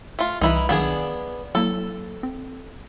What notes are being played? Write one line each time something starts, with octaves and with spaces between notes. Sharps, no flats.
A3 F4
C2 E3 G3 D#4 E4 B4
B1 D#3 B3 D4 G#4 F5
F#3 A#3 E4 A4
C4